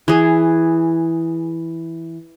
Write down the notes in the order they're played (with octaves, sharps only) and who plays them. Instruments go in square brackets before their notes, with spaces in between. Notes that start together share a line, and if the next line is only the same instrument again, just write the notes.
[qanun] E3 G#4